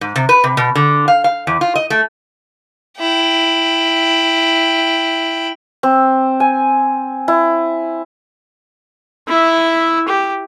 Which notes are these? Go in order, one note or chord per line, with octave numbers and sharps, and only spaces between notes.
G#2
C3
B4
C3
B2
D3
F5
F5
E2
F4
D#5
A3
E4 G5
C4
G#5
E4
E4 E5
G4